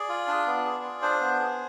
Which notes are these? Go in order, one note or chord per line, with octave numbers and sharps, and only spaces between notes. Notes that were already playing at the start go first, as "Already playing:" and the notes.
Already playing: G#4 D5
F4
D4
B3
G#4
F4
D4 C5
B3
G#4